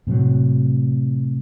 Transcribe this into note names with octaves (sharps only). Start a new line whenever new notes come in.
A2 C3 F#3